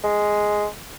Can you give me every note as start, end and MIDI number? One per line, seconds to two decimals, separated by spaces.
0.04 0.67 56